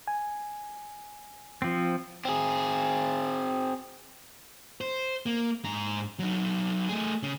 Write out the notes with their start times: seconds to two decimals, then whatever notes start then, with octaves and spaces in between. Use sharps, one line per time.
0.08 G#5
1.62 F3 C4
2.25 C4 G#4
4.81 C5
5.26 A#3
5.64 G#2 A#5
6.19 F#3 D#4
6.89 A3 G#4
7.23 C#3